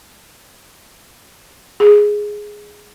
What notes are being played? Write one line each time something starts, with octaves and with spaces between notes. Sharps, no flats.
G#4